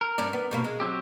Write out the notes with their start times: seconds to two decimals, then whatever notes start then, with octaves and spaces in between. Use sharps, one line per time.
0.01 A#4
0.18 G2 C#4 D5
0.33 B3
0.51 G2 B2 A#3
0.64 G#3
0.80 F#3 C4 G4